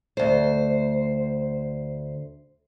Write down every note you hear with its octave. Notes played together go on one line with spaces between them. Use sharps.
D2 C5